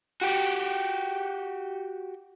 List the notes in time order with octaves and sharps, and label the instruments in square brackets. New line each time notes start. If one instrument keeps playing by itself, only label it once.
[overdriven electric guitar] F#4 G4